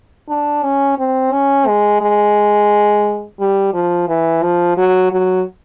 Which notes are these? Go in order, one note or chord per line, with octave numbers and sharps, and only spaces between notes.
D4
C#4
C4
C#4
G#3
G#3
G3
F3
E3
F3
F#3
F#3